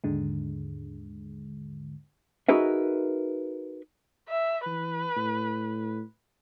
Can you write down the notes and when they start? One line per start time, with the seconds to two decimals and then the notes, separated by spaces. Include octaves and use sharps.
0.04 D#2 G#2 D3 G#3
2.49 D#4 F#4 G#4 A#4 B4 E5
4.29 E5
4.66 E3 B4
5.17 A2